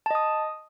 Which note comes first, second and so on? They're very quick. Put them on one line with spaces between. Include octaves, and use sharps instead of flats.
A5 D#5 D#6